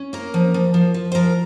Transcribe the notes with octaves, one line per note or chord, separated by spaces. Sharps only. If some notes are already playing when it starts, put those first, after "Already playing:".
Already playing: C#4
A#3 A#4
F3
F3
F3
F3
C5
F3 A#4